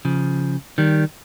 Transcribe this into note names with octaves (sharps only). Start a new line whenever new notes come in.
C#3 F3
D#3 G3